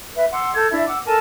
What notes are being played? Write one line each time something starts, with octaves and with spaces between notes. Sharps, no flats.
B4 E5
F#5 C6 D6 E6
A4 G6 G#6
D4 E4 E5
F#5 D6 E6
A4 A#4 G#5 A5